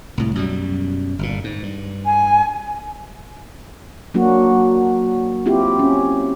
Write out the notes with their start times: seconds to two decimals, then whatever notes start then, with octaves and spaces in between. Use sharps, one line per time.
0.17 C2 A2
0.35 F#2 B2 G3
1.19 G1 A#2
1.44 G#2
1.63 G2
2.05 G#5
4.14 F#3 A#3 D4 F#4
5.46 C4 E4 F4 G4
5.79 C#4